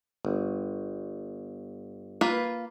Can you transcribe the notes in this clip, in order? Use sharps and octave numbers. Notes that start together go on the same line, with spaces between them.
G1
A#3 F4 B4